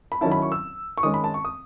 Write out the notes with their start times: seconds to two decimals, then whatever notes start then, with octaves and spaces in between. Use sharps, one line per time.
0.12 B5
0.21 D#3 F#3 C#4 E4 A5
0.32 B5
0.42 C#6
0.52 E6
0.98 C#6
1.03 D#3 G#3 C#4 D#6
1.14 B5
1.24 A5
1.34 C#6
1.45 D#6